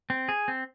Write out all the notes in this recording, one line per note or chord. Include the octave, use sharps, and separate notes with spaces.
C4
G#4
C4